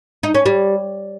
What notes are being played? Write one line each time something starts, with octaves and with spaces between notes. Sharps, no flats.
D#4
C#4
G3